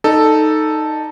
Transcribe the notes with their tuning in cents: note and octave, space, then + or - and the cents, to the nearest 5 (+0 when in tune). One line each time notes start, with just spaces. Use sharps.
D#4 +0 A4 +0 D5 +25